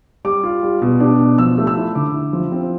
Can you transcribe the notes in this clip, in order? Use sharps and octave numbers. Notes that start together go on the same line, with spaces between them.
G3 D6
F4
G3
B2
D4
B2
F3 E6
A3
E6
E4
D3 D6
E4
F3
C4